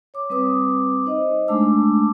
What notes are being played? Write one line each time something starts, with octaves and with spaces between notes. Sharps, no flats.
C#5 D6
G3 C4 B4 D6 D#6
D#4 C5 D#5
G#3 A3 D4 A5 D6 E6